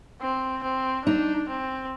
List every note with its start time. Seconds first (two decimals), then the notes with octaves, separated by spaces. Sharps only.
0.21 C4
0.63 C4
1.05 D4 D#4
1.49 C4